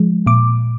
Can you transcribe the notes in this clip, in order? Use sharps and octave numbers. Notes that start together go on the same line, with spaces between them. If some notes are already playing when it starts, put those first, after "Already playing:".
Already playing: F3 G#3
A#2 D6